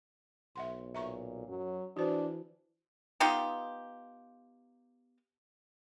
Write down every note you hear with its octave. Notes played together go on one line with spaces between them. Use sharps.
B1 E5 F#5 C6
A#2 E5 A#5 C#6
F#2 F#3
E3 D4 F#4 C5
B3 D#4 F4 G4